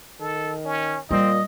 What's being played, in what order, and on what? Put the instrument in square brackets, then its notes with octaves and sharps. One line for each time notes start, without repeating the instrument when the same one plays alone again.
[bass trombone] D#3 [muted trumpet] A4
[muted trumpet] C#4
[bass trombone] A#2 [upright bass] G3 [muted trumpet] C4 [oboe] D#5